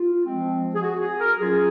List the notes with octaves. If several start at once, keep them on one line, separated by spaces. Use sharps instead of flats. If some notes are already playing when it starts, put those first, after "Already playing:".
Already playing: F4
F3 G#3 C4
G#4
F#4
G#4
A#4
F#3 C#4 F4 G#4